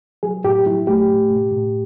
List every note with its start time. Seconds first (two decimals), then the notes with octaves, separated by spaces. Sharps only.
0.23 F#3 G#4
0.44 A2 G4
0.66 F#3 E4
0.87 A3 G4
1.08 A2
1.31 A2
1.52 A2